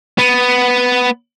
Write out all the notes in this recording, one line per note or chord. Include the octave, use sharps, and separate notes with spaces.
B3